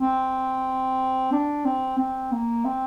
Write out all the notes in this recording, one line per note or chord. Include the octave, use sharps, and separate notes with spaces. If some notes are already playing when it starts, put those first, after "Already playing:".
C4
D4
C4
C4
A#3
C4